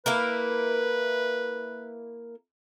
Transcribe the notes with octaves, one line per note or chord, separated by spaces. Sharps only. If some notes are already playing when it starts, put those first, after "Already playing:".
A#3 E4 A#4 B4